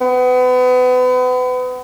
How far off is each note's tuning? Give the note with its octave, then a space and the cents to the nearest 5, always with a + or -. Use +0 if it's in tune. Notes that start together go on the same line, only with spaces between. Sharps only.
B3 +35